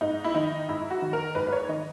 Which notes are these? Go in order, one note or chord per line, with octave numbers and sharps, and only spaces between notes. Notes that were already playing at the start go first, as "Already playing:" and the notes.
G#2 D#4
E4
D#3 D#4
G#2 E4
F#4
D#3
A#4
G#2 B4
B4
C#5
D#3 D#5